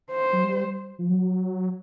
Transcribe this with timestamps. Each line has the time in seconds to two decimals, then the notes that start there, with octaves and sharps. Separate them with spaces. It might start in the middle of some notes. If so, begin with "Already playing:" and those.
0.11 C5
0.33 F#3
0.44 G3
0.99 F3
1.10 F#3